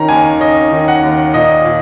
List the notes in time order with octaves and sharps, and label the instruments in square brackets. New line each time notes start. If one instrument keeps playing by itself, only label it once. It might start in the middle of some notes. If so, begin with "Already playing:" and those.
Already playing: [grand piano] D#3 C#4 A#5
D#2 G#5
C#4 D#5
D#3
F#5
D#2
A#2 D#5
A#2